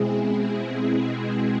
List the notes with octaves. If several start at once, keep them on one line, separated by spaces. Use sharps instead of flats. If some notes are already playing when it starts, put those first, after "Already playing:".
Already playing: B2 G#3 C4 E4 G#4